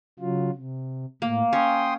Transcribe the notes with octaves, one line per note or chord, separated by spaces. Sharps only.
C#3 F#3 F4
C3
A2 A#3
C#4 G5 C6 D#6